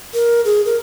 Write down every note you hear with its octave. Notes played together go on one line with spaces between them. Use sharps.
A#4
G#4
A#4